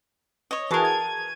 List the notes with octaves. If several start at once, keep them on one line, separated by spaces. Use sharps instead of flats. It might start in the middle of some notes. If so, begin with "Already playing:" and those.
C#5 D#5
E3 F#4 G#4 A#4 A5
G#6 D#7